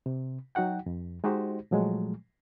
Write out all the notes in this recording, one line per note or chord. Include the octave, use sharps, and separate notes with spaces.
C3
F#3 D#4 F#4 F#5 G5
F2
G#3 D#4 F#4 G4 C5
A#2 F3 F#3 G#3 A3